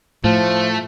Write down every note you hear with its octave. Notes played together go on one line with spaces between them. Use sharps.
A2 F3 A3